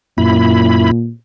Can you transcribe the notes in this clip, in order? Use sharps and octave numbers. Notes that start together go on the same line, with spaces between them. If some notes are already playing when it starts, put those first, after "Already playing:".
F#2 A#2 E4 B5